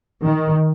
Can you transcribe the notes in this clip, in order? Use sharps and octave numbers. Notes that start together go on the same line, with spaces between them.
D#3